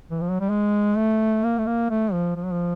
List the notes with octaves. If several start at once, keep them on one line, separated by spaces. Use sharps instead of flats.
E3
F3
F#3
G3
G#3
A3
A#3
A3
A#3
A3
F3
F3
F#3
F3